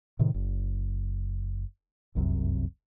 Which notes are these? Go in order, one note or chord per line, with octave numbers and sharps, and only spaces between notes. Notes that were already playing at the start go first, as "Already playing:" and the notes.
A2 C3 D#3
F#1
F1 C2 F#2 C3